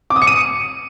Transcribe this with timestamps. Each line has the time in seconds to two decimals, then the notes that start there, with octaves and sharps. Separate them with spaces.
0.10 D6
0.16 D#6
0.22 C#7
0.27 D#7